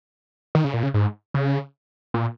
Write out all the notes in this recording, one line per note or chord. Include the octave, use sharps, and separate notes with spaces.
D#3
C#3
A#2
C#3
G#2
C#3
A#2